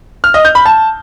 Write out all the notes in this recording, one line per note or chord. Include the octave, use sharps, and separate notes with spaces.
F6
D#5
G6
B5
A5